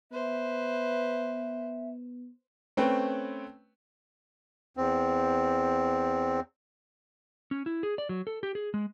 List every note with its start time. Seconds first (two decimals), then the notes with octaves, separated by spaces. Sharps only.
0.12 B3 B4 C5 E5
2.77 A3 C4 C#4 B4 G5
4.77 E2 C4
7.51 C#4
7.66 E4
7.83 G#4
7.98 D5
8.09 F#3
8.27 A4
8.43 G4
8.55 G#4
8.74 G#3